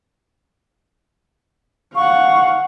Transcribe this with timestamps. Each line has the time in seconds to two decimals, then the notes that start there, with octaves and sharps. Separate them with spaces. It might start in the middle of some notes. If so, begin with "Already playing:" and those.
1.95 F5 F#5 C#6